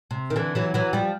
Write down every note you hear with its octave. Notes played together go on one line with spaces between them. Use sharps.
C3
D#3
D3 E3
E3 F#3
E3 F#3
F3 G3